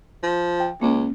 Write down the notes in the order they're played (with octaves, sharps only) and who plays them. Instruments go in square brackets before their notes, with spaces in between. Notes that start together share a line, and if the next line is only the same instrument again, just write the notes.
[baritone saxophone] F3
[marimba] G5
[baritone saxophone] C#2 [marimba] A#3 C#4